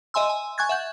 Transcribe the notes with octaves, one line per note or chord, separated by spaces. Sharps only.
D#5 E5 G#5 C6 E6
G#5
G#5 C#6 F#6 G#6 A6
E5 F#5 G6